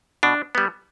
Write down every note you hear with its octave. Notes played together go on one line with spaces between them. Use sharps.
B2 D4
G3 B3